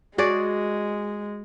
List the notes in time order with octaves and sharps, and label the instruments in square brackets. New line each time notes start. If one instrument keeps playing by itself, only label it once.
[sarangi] G#3 [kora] F#4 G#4 D5